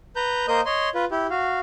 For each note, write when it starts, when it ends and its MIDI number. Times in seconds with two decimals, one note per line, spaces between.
0.16 0.46 71
0.16 0.46 82
0.16 0.46 91
0.48 0.61 58
0.48 0.61 70
0.48 0.61 72
0.48 0.61 75
0.48 0.61 87
0.48 0.61 91
0.66 0.89 73
0.66 0.89 75
0.66 0.89 84
0.95 1.05 65
0.95 1.05 71
1.11 1.27 64
1.11 1.27 67
1.30 1.60 66
1.30 1.60 77